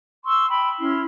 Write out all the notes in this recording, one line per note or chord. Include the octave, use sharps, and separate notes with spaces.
C6 C#6 E6
G5 B5 E6
C#4 E4 C6